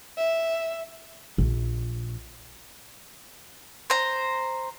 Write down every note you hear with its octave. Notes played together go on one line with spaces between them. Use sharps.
E5
A#1
C5 A#5